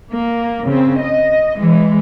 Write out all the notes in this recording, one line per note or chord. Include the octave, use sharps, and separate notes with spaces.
A#3
C#3 C4
D#5
E3 G#3